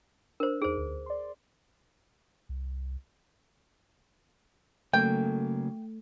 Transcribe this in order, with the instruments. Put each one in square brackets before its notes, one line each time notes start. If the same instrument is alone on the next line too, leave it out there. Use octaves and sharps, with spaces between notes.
[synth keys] D4 [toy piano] A#4 C5
[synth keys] E2 D#4 [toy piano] G#4 C5
[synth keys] D2
D5 C6
[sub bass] C2
[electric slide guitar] C#3 F#3 A#3 [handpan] A3 [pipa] G5